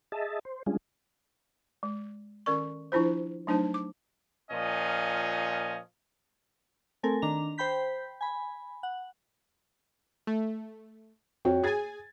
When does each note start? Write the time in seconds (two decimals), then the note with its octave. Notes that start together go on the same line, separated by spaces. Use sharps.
0.12 G#4 D#5 E5 A5
0.45 C5
0.66 G3 G#3 C#4 D4 F4 G#4
1.83 G#3
2.46 D#3 C#4 A#4 D5 C#6
2.92 F3 D4 E4 F4 C5
3.47 F#3 A3 D4 D#4 C5 A5
3.74 D6
4.51 A#2 F3 C#4 D#5
7.03 A3 C4 A4 A#4 G#5
7.22 D#3 D4 A#5 F7
7.58 C5 G5 B5 G6 B6
8.21 G#5 B5
8.83 F#5
10.27 A3
11.45 F2 F#4 C#5 G5
11.64 G#4 G#5 G#6 A6